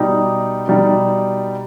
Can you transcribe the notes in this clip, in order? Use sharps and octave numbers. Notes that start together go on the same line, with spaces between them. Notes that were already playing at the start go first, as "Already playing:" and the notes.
Already playing: B2 G3 D#4
B2 G3 D#4